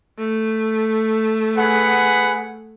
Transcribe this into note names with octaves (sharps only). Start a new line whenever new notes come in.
A3
G#4 B4 F#5